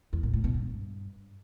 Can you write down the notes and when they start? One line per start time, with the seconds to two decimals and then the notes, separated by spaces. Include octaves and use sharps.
0.13 E2
0.23 A#2
0.34 A2
0.44 B2
0.54 G2